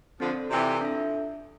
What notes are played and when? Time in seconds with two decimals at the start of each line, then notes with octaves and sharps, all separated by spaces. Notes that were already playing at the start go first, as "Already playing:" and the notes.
0.20 D3 F3 C4 F4 A4 D5
0.50 C3 E3 C4 F4 A4 D5
0.81 D4 A4 E5